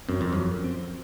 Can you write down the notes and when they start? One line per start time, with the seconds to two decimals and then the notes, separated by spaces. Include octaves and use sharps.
0.09 F#2 C4
0.21 F2
0.33 F#2 F3
0.64 C4